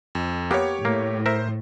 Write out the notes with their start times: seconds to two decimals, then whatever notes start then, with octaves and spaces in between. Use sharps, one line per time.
0.15 F2
0.51 A#3 B3 G4 C#5
0.85 A2 A#3
1.26 A#4 C5 E5